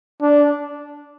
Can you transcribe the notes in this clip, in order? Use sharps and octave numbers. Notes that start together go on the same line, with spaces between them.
D4